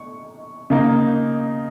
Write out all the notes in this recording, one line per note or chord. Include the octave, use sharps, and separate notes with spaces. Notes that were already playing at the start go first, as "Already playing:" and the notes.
Already playing: C#6
C#3 A#3 D#4